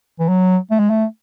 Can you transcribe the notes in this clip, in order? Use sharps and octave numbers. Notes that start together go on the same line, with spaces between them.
E3
F#3
A3
G#3
A3